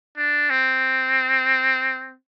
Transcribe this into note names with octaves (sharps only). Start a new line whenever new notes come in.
D4
C4